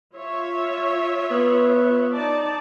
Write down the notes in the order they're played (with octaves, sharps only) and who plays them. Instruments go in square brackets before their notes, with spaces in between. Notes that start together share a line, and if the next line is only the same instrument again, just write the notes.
[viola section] F4 C#5 E5
[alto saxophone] B3
[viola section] D#4 D5 A5